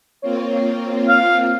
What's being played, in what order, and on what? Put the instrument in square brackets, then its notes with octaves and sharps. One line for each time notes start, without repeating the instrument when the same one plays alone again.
[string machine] A#3 C4 F4 [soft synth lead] C#5
[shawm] F5